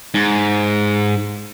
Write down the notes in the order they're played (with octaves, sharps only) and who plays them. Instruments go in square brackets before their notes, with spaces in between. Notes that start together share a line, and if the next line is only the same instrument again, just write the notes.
[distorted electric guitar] G#2